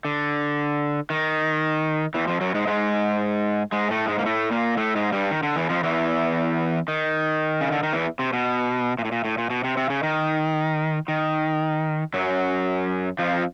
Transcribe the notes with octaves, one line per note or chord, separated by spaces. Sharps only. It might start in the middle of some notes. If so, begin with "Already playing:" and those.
D3
D#3
E2 E3
F2 F3
F#2 F#3
G#2 G#3
G#2 G#3
G#2 G#3
A2 A3
G#2 G#3
A#3
A2 A3
A#2 A#3
A2 A3
G#2 G#3
G2 G3
D#3
D3
E2 E3
F2 F3
E2 E3
D#3
C#3
D3
D#3
E2 E3
C3
B2
A#2
A2
A#2
A2
A#2
B2
C3
C3
C#3
D#3
D#3
F#2 F#3
F2 F3